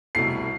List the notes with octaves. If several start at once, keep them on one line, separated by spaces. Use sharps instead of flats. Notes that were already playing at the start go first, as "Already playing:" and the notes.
C2 B2 A3 E4 C7